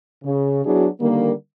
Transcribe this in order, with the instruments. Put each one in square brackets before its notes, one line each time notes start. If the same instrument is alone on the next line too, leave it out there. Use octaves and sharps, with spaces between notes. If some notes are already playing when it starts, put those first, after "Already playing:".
[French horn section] C#3
F#3 B3 D4 E4 F#4 G#4
D3 D#3 G3 A#3